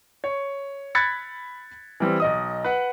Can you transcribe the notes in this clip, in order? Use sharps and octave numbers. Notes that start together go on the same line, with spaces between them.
C#5
B5 F#6 G#6 A6 B6 C#7
E3 G3 C4
B1 D#5 D#6
B4 F#5